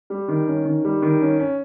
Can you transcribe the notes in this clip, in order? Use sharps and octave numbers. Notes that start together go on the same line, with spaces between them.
G3
D#3
C#4
D#3
G3
D#3
C#4
C#4